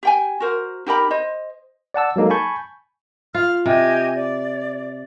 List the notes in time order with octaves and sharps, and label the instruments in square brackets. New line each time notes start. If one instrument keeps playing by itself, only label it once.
[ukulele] G4 G5 G#5
F#4 A#4 C5
D#4 G4 A#4 B5
C5 D#5
[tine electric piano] D5 F#5 A5 E6
F#3 G#3 A#3 D#4 A4
G#5 A5 B5 C#6 G6
[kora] F4 [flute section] F6
[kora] C3 [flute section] G4 D#5 G#5
[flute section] D5